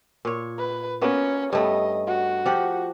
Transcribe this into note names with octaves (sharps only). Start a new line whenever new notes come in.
A#2 C#5
B4
A#3 B3 C#4 F#4
G2 A3 B3 D#5
F#4
F3 G4 F#5